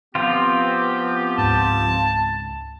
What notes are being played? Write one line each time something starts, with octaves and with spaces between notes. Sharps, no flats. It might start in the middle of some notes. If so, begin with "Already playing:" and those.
F3 B3 C4 F4 G4
C#2 G#2 A5